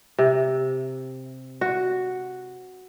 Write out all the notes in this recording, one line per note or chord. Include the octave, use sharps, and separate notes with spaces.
C3
F#4